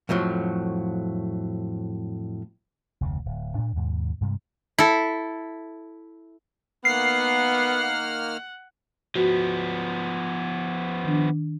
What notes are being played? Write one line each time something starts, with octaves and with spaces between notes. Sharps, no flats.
F2 A2 F3 F#3
F1 D2 C#3
D1
A2 D4
D#2 G#2 B2
G2 C3 G3 G#3
E4 A4
D#3 A#3 B3 F#5 F6 C7
F3 B3 F#4
D#3 D4